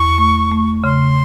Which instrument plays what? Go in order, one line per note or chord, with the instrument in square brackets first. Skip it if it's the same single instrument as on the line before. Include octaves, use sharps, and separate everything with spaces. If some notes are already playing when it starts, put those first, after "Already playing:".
Already playing: [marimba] E2 [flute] C#6
[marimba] A3
A3
[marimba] C#3 [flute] C6